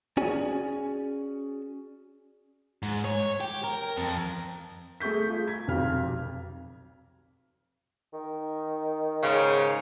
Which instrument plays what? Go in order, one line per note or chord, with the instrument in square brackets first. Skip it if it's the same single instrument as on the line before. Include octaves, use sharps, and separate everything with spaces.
[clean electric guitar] C#4 F#4 G#4 D5 G#5
[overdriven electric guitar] G#2
C#5
G4
A#4
F2
[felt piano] A3 G#4 C#6 G6 B6
F4 G#4
G#6 B6
F1 B1 F2 F6
[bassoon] D#3
[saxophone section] G#2 C#3